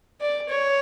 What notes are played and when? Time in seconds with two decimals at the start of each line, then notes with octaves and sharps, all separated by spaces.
0.21 D5
0.49 C#5